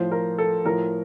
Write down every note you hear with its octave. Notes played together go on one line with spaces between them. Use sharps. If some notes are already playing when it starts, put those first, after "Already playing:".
Already playing: A2 F3 C5
A#4
A4
A2 F3 A#4